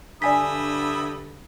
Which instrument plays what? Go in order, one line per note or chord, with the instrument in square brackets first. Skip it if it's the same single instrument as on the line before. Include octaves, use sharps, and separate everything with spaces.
[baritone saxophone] G2 [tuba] D3 [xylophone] D5 G#5 B6 [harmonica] E5 B5 D#6